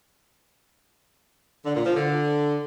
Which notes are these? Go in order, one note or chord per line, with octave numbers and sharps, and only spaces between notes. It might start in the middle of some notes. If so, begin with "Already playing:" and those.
D3
A#2
F3
D3